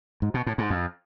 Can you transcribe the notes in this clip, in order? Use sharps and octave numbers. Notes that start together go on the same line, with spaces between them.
G#2
B2
A2
G#2
F2